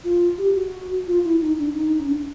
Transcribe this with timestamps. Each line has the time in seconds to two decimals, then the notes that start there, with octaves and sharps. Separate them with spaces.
0.04 F4
0.38 G4
0.55 F#4
1.07 F4
1.24 E4
1.41 D#4
1.58 D4
1.75 D#4
2.00 C#4
2.09 D4